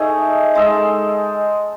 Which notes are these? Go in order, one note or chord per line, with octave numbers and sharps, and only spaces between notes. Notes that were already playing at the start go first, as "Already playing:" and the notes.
Already playing: A3 D#4 G#4 D#5
G#3 D#4 A4